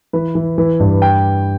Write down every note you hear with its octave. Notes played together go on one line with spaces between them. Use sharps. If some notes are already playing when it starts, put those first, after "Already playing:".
E3 B4
E3
E3
G2
G5